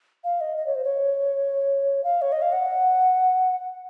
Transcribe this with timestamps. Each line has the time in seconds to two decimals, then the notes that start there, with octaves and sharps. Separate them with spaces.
0.24 F5
0.41 D#5
0.57 D#5
0.66 C#5
0.75 C5
0.84 C#5
2.04 F5
2.22 C#5
2.32 D#5
2.42 F5
2.52 F#5